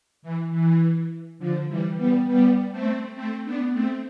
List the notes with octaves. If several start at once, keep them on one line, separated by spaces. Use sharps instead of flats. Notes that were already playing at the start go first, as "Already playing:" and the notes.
E3
E3
D3 F3
E3 G3
G3 B3
G3 B3
A3 C4
A3 C4
B3 D4
A3 C4